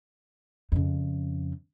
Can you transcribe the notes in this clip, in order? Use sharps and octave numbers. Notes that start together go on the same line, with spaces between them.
F2 C#3